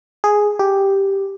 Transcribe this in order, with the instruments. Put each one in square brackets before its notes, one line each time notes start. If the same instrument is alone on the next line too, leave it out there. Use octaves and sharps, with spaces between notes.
[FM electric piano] G#4
G4